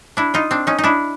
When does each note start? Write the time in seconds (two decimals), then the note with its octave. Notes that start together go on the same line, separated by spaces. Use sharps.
0.17 D4 E4
0.34 D#4 F4
0.51 C4 D4
0.67 C#4 D#4
0.78 D#4
0.84 D4 E4